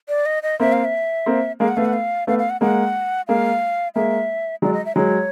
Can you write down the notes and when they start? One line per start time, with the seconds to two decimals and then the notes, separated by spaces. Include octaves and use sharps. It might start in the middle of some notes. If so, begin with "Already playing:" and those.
0.09 D5
0.26 D#5
0.43 D#5
0.60 A#3 C4 E5
0.72 F5
0.85 E5
1.26 A#3 C4
1.60 G#3 A#3 F5
1.68 F#5
1.77 A3 B3 F5
1.85 F#5
1.93 F5
2.27 A3 B3 F5
2.39 F5
2.50 F#5
2.61 G#3 A#3 F#5
3.28 G#3 A#3 F5
3.95 G#3 A#3 E5
4.62 F#3 G#3 D5
4.74 D#5
4.86 E5
4.96 F#3 G#3 C#5